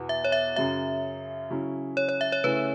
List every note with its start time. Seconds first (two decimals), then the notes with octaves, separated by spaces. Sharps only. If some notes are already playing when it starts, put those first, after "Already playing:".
Already playing: E2 B2 B3 F#4
0.09 E5
0.24 C#5
0.32 E5
0.56 F#2 C#3 F#3 E5
1.50 C#3 F#3 C#4 E4
1.97 C#5
2.09 C#5
2.21 E5
2.32 C#5
2.44 C#3 A3 C#4 E4 B4